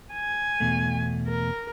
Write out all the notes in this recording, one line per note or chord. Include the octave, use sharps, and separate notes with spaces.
G#5
E2 B2 A3
A#4